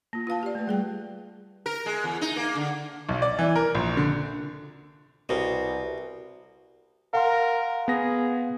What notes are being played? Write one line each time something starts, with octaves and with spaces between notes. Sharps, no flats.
A#3 F4
F4 B4 F5 A5
G4 D5
A3 B4
G3 G#4 G5
A#4
G#3
E2
D#4
A#3
D3
B1
D5
E3
A#4
A#1
D3
C2 B2
A#4 F5 F#5 C6
B3 G#4 A#6